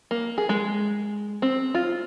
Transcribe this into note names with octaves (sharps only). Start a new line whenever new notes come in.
A#3
G#4
G#3
C4
F4